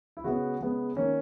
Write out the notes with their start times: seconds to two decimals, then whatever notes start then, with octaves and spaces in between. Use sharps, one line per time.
0.17 E4
0.24 C#3 G#3 B3 F#4
0.61 C#3 G#3 B3
0.97 D#3 A#3 C#4